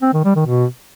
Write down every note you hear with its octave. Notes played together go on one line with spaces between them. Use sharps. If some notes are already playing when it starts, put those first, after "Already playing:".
C4
D#3
G3
D#3
B2